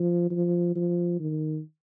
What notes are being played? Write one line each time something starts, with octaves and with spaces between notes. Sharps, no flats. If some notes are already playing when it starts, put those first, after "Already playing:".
Already playing: F3
F3
F3
D#3